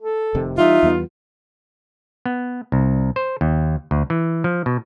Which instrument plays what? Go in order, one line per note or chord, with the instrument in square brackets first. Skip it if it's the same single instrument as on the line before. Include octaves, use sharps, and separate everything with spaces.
[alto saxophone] A4
[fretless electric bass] F1 C3 D#3
[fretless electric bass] E3 G3 [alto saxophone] D#4 [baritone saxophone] F4 [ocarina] E5
[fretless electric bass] E2 G3 B3
[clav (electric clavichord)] B3
C2
C5
D#2
D2
E3
F3
B2